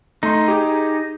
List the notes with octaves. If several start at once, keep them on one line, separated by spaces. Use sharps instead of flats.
A3 D#4 C6
G4 G#4